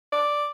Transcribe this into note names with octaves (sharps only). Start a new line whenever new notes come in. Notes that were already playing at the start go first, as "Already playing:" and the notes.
D5